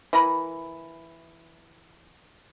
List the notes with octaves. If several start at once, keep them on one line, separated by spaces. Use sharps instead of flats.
E3 A#4 A#5 B5